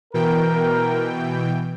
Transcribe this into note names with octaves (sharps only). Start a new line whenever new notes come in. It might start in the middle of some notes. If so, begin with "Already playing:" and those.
B2 E3 A#4 G5